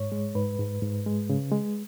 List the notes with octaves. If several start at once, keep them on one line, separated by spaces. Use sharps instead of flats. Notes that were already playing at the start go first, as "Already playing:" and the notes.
Already playing: G#2 C#5
G#3
G#2 B4
G#2
G#2
G#3
C#3
G#3